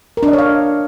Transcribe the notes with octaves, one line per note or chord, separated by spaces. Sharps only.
A#4
D4
D#5
C#5
F5